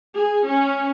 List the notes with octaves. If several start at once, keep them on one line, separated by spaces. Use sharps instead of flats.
G#4
C#4